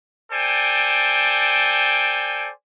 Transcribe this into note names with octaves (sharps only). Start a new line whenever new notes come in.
A4 C5 D5 G5 G#5